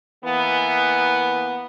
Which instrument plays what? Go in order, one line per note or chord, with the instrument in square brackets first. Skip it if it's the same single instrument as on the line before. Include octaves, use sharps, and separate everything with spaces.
[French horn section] E3 A#3 B3